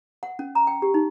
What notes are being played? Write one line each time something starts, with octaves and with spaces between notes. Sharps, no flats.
F#5
C#4
A#5
G5
G4
D#4